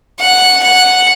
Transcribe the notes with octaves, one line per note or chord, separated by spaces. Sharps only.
F#5
F#5